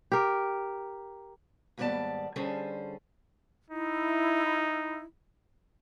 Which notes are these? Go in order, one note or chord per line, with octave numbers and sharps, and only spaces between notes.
G4 A#4
D#2 G#2 G3 B3 D5 A5
D3 G3 C#4 G#4 A4 C5
D#4 E4